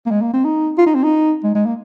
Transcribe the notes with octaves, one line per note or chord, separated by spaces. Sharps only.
A#3
G#3
A#3
C4
D#4
F4
D#4
C4
D#4
G#3
G#3
A#3